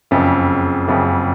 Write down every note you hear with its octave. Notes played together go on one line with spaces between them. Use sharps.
F#1 F2 C#3
F#1 F2 C#3